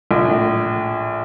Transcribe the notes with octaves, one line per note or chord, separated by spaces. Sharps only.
A#1
A2